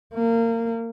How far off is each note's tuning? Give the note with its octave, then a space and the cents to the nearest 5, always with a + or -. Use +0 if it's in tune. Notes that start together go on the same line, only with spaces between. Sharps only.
A#3 -25